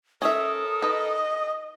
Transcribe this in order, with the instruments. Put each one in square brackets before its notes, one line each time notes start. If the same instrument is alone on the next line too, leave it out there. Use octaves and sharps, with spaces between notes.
[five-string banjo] C#4 E5 [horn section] A4 A#4 [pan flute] D#6
[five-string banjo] D#4 B4 [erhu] D#5